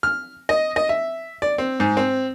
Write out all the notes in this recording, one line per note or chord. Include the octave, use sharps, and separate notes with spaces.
F6
D#5
D#5
E5
D5
C4
G#2
C4